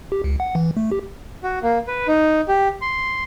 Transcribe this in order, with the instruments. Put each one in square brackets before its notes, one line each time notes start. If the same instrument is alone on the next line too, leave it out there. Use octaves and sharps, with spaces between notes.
[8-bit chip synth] G4
C#2
F#5
E3
A3
G4
[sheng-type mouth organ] F#4
A#3
B4
D#4
G4
C6